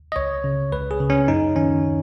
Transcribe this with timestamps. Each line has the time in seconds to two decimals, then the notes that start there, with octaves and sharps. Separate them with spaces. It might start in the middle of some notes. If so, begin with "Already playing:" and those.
0.12 D#5
0.16 C#2 C#5
0.44 C#3
0.72 C#2 B4
0.91 G#4
1.00 C#3
1.10 C#4
1.28 F#2 D#4
1.55 D#3 C#4